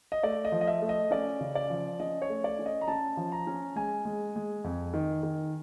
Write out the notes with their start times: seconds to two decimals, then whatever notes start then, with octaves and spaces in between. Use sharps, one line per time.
0.12 D#5
0.23 A3 D5
0.45 D#5
0.52 F3
0.61 D#5
0.67 E5
0.82 A3
0.89 D#5
1.11 C#4 D5
1.40 C#3
1.55 D5
1.70 F3
2.00 C#4 D#5
2.22 C#5
2.29 A3
2.44 D5
2.59 C#4
2.66 D#5
2.81 A#5
2.88 C#4 A5
3.17 F3
3.32 A#5
3.47 C#4
3.76 G#3 G#5
4.05 G#3
4.36 G#3
4.64 F2
4.94 D#3
5.23 D#3